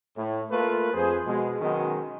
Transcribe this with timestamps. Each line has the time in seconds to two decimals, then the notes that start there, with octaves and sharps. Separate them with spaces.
0.17 A2
0.50 A3 A#3 F4 A#4 B4
0.93 F2 G#4 C5
1.26 B2 G#3
1.61 D#3 F#3 G#3 B3 C#4 D#4